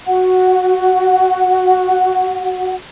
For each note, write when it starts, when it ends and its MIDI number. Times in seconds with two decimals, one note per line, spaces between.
0.07 2.74 66
0.07 2.74 78